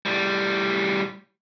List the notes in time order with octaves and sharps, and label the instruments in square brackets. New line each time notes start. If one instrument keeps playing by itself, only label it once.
[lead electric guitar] A2 G3